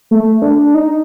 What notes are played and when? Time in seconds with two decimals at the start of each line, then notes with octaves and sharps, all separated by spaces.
0.11 A3
0.42 D4
0.74 D#4